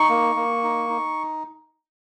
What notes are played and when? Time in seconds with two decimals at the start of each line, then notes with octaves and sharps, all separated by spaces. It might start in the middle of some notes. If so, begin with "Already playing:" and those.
Already playing: D#4 C#6
0.09 A#3
0.36 A#3
0.63 D#4
0.90 D#4